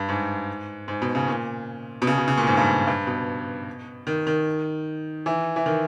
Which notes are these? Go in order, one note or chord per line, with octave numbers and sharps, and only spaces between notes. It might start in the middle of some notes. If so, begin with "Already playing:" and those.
Already playing: G2
G#2
G#2
B2
C#3
A#2
B2
C#3
B2
C#3
A#2
G#2
G2
G2
B2
D#3
D#3
E3
E3
D#3